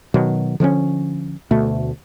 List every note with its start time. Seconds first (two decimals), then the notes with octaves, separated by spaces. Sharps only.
0.14 B2 D#3 F#3
0.60 D3 F3 G#3 C#4
1.51 D2 B2 A3